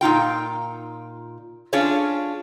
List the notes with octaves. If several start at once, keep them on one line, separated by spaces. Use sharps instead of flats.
A#2 D#4 F4 G5
C#4 D4 F4 G#4 C#5 D5